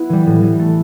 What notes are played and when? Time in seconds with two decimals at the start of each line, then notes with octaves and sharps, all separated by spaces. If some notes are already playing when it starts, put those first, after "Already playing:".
Already playing: B3 E4 B4
0.09 E3 G3
0.26 A2
0.42 E3 G3
0.59 A3